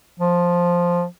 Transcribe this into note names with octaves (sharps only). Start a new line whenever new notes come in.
F3